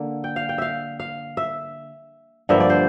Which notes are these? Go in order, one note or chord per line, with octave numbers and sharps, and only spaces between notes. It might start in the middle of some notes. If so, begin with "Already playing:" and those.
Already playing: D3 A#3
G5
F5
G5
E5 F5
F5
E5
G2 D3 F3 A#3 E5
D5
C5